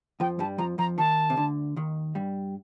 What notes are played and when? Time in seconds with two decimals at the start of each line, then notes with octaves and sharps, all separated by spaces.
0.20 F2 F3 G5
0.39 G2 G3 A5
0.58 F2 F3 A#5
0.78 F2 F3 A#5
0.98 D#2 D#3 A5
1.30 C3
1.37 D2 D3
1.76 D#2 D#3
2.15 G2 G3